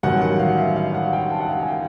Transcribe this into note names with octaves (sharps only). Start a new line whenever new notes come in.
A1 G2 D#3 F#3 F#5
F#5
F5
E5
F5
F#5
G5
A5
F#5
F5
G#5
G5